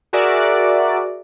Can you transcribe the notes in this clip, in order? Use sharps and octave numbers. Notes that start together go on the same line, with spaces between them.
F#4 G#4 A#4 D5 E5